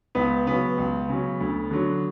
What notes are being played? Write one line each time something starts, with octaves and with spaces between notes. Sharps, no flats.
C#2 B3
C#3 F#3 B3
C#2
C#3 F#3
D2
D3 F#3